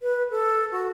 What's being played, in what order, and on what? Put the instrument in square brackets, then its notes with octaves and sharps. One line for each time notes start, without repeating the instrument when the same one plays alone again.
[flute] B4
A4
F#4